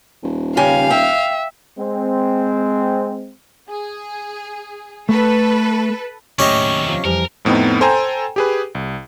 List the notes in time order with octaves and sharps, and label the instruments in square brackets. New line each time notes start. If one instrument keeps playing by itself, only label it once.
[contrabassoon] D#1
[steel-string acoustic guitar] C#3 G4 G#5 [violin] F5
[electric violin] E5 [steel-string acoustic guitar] G5
[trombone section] G#3 C4
[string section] G#4
[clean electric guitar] A3 [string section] A4 B4
[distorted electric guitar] D#2 F#3 [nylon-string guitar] A2 [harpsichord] C#4 G4 D#5
[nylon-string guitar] C3 F4
[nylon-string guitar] F2 E3 G3 [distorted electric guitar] A#4
[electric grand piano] F2 A2 B3 C4 D#4
A4 C5 G5 G#5 A#5
G4 G#4 B4
C2